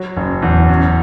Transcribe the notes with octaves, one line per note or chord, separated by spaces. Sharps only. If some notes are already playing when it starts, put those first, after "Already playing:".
Already playing: F#3
F#1
E2
F#2